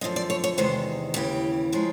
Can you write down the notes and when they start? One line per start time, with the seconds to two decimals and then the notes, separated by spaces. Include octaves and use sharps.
0.01 F#2 D3 F3 D#5
0.16 D5
0.30 C#5
0.44 C#5
0.58 E2 C3 D#3 G#3 C5
1.14 D#2 C#3 E3 G4
1.72 C#3 F3 G#3